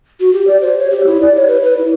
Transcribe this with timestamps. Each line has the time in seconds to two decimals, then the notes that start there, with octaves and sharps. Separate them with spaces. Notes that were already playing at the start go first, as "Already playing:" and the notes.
0.20 F#4
0.33 G4
0.47 D5
0.61 C5
0.79 C#5
0.91 G4
1.06 E4
1.21 D5
1.36 C#5
1.48 B4
1.62 B4
1.77 E4